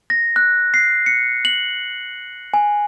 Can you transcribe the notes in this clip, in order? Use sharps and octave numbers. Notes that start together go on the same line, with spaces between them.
A#6
F#6
C7
C#7
F#7
G#5